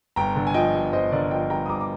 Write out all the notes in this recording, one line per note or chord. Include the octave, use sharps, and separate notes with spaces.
G1 G5 A#5
D3
G#5
F3 D#5 G5
G2
G1 C5 D#5
D3 A#4 D5
F3 D#5 G5
G2 G5 A#5
D#6
G1 A#5 D6
D6